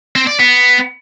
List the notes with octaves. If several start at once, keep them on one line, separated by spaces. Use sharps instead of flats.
C4
D5
B3